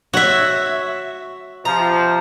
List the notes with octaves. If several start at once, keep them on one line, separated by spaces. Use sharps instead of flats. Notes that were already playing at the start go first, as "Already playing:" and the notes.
F#4 C#5 E5
C3 F3 A#5